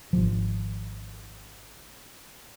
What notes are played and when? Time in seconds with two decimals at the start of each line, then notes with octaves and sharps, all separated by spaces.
0.13 G#1 F3